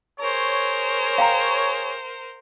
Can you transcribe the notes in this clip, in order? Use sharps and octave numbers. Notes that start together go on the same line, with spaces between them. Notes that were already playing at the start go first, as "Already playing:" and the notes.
G#4 A#4 C5 C#5
F5 G5 A#5